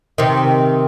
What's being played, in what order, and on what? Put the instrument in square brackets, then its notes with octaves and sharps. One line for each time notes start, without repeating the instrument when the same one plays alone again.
[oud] C3 D#3